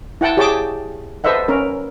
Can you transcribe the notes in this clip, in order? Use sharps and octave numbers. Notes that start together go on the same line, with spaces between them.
E4 F#5 G5 A5
G4 G#4 C#5 G5 A5 D6
A4 B4 C5 D#5 E5 F#5
C#4 A#4